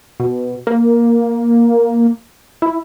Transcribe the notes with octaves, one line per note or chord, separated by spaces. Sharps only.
B2
A#3
E4